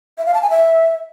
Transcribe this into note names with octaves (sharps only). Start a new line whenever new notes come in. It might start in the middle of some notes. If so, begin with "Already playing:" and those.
E5
F5
A5
G#5
E5